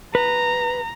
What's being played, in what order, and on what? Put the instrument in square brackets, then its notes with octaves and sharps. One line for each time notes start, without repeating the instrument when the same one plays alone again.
[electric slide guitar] B4 [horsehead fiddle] A#5